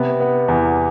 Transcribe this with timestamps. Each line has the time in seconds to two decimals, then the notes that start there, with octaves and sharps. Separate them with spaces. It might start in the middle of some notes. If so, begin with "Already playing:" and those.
Already playing: C3 B3
0.20 B3
0.48 E2